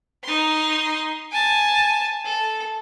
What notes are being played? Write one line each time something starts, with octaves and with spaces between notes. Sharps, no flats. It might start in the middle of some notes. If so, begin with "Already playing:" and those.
D#4 C6
G#5 A5
A4